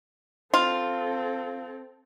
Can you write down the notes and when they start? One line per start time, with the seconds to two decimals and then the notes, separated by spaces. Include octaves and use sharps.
0.54 C4 F4 A4